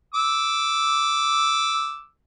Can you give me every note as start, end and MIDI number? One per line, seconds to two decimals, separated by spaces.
0.14 2.04 86
0.14 2.04 88